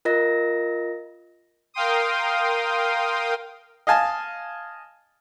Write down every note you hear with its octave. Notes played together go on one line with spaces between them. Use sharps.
F4 A#4 D#5 A#6
A#4 F5 G5 C6 D#6
D#5 F5 G#5 A5